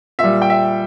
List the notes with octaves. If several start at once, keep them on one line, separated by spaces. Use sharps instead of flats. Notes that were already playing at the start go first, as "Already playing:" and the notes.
A#2 G3 E5
G5
E5